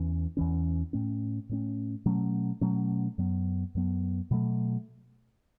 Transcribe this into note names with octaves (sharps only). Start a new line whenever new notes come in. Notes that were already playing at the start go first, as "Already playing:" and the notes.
Already playing: E2 E3 C#4
E2 E3 C#4
A2 A3 C#4
A2 A3 C#4
B2 F#3 A3 C#4
B2 F#3 A3 C#4
F#2 F#3 B3
F#2 F#3 B3
B2 F#3 A3